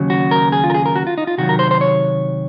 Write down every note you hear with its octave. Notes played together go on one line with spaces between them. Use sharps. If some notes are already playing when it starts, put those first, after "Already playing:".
Already playing: D#2 C#3 F#3
F#4
A#4
G#4
F4
A#4
G#4
A#4
F#4
F4
D#4
F4
C3 D#3 F#3 F#4
A#4
C5
C5
C#5